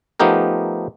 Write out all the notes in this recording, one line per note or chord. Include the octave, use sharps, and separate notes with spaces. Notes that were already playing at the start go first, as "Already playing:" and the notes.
F3 A3 B3 D#4 G4 A#4